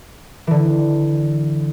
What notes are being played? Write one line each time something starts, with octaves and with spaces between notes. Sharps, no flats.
D3 E3